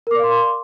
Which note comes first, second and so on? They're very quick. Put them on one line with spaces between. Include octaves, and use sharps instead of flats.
A#4 D6 D5 F5 C6